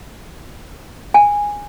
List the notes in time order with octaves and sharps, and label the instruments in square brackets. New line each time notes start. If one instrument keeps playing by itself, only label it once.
[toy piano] G#5